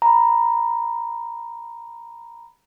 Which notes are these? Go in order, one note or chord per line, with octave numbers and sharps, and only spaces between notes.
A#5 B5